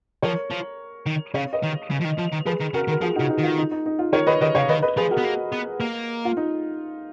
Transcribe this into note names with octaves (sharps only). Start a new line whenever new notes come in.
F3 A#4 C#5
F3
D#3
C#3 C#5 F5
B4 D#5
D#3
C#3
F3
D#3
F3
D#3
F3 G#4 B4
D#3
C#3 F#4 A#4
D#3
A#4
F3 F4 G#4
D#4 F#4
C#3
D#4 F#4
D#3 F4
D#4
D#4
D#4
F4
D#3 A#4 C#5
D#3 B4 D#5
D#3 B4 D#5
C#3 C#5 F5
D#3 B4 D#5
B4 D#5
F3 G#4 B4
F#4 A#4
B3
A#3
B3
A#3
F4
D#4